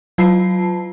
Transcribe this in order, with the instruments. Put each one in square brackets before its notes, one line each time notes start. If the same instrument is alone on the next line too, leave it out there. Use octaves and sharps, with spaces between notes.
[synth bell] F#3 F4 A5 C7